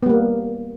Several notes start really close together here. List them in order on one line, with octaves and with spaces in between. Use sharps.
B3 G3 A#3